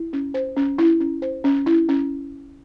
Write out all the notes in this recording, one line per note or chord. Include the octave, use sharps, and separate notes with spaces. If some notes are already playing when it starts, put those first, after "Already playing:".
Already playing: E4
C#4
C5
C#4
E4
C#4
C5
C#4
E4
C#4